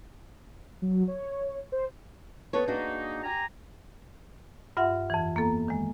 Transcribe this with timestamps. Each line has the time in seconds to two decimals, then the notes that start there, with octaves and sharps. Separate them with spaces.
0.82 F#3
1.08 C#5
1.72 C5
2.53 B3 A4 C#5
2.68 G#3 A#3 D4 D#4 F#4
3.24 G4 G#5 A#5
4.77 G2 F4 E5 F#5 C6
5.10 F2 E3
5.36 A#3 B3 A4 A#5
5.68 D#3 G#3